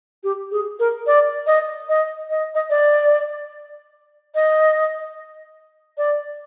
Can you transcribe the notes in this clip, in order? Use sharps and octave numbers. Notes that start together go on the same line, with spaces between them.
G4
G#4
A#4
D5
D#5
D#5
D#5
D#5
D5
D#5
D5